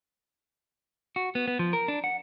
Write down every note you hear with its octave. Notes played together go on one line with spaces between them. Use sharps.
F#4
B3
B3
F3
A#4
D4
F#5